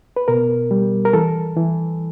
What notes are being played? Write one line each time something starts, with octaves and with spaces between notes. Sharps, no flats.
B4
B2 A#4
G3
A#4
E3 A4
E3